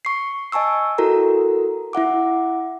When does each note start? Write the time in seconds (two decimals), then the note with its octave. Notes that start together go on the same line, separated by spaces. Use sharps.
0.05 C#6 C7
0.52 D#5 G#5 A5 C#6 E6
0.98 E4 F#4 A4 A#4 A#5
1.93 E4 E5 F#5 D6